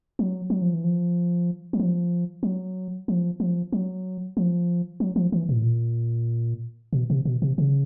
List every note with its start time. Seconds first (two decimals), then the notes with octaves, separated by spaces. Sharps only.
0.19 F#3
0.50 F#3
0.62 F3
0.74 E3
0.84 F3
1.73 F#3
1.79 F3
2.43 F#3
3.08 F3
3.40 F3
3.72 F#3
4.37 F3
5.00 F#3
5.16 F3
5.32 E3
5.49 A#2
5.57 A2
5.63 A#2
6.93 B2
7.10 C3
7.25 B2
7.42 C3
7.58 C#3